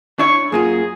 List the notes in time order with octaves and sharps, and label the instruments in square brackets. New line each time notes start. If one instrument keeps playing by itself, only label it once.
[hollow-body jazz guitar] D4 E4 C#5 [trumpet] C#6
[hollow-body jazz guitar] F#2 A#3 F4 [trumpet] G#4